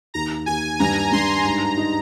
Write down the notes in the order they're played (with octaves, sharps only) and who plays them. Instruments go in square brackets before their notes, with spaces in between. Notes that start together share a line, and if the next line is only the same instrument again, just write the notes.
[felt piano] D#2 [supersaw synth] A#5
[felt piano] D#2 [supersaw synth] G#5
[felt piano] G2 [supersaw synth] A#5
[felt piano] G2 [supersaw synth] C6
[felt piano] G#2 [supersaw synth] A#5
[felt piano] D#4